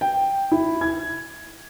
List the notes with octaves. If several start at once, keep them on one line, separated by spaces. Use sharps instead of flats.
G5
E4
G#6